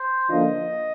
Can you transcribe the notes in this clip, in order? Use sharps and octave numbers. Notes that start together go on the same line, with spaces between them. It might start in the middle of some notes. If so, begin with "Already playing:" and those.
Already playing: C5
D3 F3 A#3 D4 F4 D#5